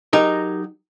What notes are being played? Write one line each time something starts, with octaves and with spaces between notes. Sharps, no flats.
F#3 D#4 G4 G#4 A#4